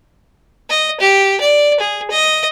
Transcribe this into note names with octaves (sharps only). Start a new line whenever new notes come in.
D#5
G4
D5
G#4
D#5